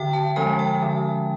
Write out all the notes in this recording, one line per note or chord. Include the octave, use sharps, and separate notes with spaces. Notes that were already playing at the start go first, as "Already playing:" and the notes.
Already playing: D3 G5
A5
F3 G#3 C#4 G#5
G5
D3